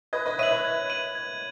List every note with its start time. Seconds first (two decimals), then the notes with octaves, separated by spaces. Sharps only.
0.13 B4 D#5 G#6
0.26 B4 D#5
0.39 C#5 E5 D#7 F#7
0.51 B4 D#5
0.65 G#6
0.90 D#7 F#7
1.15 G#6